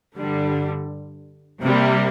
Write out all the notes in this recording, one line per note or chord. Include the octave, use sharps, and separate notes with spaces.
G2 D3 G3
C3 G3 A#3